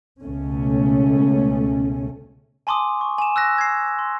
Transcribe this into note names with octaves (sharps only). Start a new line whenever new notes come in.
C#2 B2 A3 C#4
G#5 A5 C6 D6 D#6
C#6
G#5 E7
E6 F#6 A#6
G#6 C7
C6